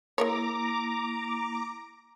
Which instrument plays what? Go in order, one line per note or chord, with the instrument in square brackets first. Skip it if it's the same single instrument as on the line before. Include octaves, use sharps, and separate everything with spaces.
[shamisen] G#3 A#4 C#5 [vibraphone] A#3 E4 [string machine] A#5 D6